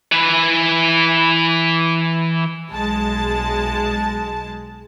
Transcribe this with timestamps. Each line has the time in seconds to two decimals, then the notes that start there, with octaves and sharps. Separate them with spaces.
0.12 E3 B4
2.70 B1 G#3 A5